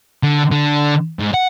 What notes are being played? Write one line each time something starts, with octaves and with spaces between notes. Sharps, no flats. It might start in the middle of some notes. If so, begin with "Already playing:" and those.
D3
D3
G#2
F#5